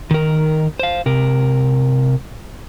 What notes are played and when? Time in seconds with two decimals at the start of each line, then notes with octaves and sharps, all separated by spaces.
0.11 D#3 A#4
0.79 C5 F5
1.06 C3 A#4